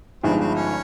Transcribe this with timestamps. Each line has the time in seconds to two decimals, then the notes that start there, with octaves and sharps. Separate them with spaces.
0.24 G1 G2 F3 G#3 C4 D#4
0.40 C4
0.55 C#4